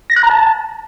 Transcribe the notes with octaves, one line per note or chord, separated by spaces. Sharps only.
A#6
F#6
A#5
A5